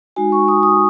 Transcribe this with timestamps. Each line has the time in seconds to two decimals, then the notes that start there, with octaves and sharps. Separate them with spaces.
0.16 G#3 D#4 F#4 G#5
0.32 C#6
0.48 D#6
0.63 D#6